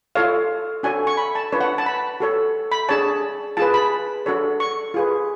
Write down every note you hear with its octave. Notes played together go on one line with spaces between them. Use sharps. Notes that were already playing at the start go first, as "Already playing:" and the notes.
F4 A4 C#5 F5
D4 F#4 A4 C#5 G#5
C#6
B5
A5
D4 F4 B4 C#5
F#5
A5
B5
F#4 A4 C#5
B5
D4 G#4 C#5 A5
F4 G#4 B4 A5
B5
D4 F#4 A4 C#5
C#6
F4 G#4 B4